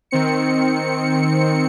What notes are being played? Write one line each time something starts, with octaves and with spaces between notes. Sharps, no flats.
D#3 C4 C#7